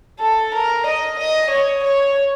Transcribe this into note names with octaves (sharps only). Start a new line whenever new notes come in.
A4
A#4
D#5
D#5
C#5
C#5